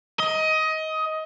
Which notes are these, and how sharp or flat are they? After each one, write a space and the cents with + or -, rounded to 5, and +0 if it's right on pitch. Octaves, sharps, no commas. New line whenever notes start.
D#5 +20